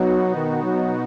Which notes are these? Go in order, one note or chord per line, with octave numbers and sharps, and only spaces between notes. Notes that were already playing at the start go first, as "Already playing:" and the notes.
Already playing: B2 F#3 B3 D#4 F#4
D#3
F#3